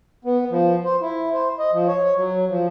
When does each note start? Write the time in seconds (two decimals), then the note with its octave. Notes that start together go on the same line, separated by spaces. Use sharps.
0.25 B3
0.50 F3
0.85 C5
1.01 E4
1.33 C5
1.59 D#5
1.72 F3
1.88 C#5
2.16 F#3
2.48 F3